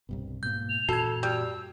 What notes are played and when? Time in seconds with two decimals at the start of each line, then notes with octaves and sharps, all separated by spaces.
0.09 C2 G2 B2
0.43 G#2 B2 A#3 G6
0.69 F7
0.89 F#2 A#2 E3 F#4 A4 G#6
1.23 G3 E6